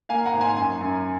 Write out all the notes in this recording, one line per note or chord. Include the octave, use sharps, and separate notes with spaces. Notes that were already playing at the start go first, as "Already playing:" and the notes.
A#3 F5 G#5
F#5 A#5
G#1
G#5 C6
F#2 G#5 C6
F#2